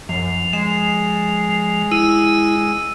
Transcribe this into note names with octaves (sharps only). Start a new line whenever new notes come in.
F#2 F3
G#3 E7
E4 E6 D#7